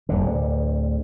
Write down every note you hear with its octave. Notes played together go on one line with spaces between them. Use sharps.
D1 G#1 D3